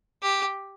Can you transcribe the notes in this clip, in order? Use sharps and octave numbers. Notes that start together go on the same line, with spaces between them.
G4